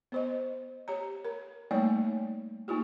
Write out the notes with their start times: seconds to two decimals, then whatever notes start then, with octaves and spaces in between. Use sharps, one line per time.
0.12 B3 C5 D#5
0.88 G4 C#5 A#5
1.25 A#4
1.71 G3 A3 A#3 D#4 C#5 D5
2.68 A#3 D#4 F4 G4